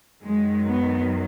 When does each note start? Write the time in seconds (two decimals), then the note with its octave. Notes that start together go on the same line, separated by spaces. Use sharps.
0.23 F#2 D#3 F#3 G#3
0.67 B3